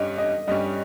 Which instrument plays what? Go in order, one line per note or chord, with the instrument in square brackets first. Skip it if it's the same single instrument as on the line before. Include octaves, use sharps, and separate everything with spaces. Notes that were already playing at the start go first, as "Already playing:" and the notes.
Already playing: [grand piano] G2 G3 C#4 G4 [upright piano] D#5
[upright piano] D#5
[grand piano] G2 G3 C#4 G4 [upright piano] D#5